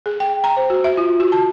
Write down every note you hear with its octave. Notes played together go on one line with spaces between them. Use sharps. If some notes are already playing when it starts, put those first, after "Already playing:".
G#4
G5
A#5
C5
F#4
E5
F4
F#4
A5